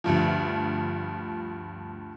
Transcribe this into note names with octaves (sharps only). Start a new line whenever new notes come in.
D2 G2 F3